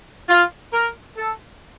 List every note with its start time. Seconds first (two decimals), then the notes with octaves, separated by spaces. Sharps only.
0.29 F4
0.73 A#4
1.17 A4